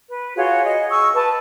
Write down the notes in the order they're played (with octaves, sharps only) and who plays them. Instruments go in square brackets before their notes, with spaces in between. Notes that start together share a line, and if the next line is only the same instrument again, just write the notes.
[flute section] B4
F4 F#4 G#4 C#5
G#4 D#5
C#6 D#6 E6
B4 A5